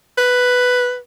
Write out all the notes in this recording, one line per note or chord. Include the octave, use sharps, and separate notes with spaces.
B4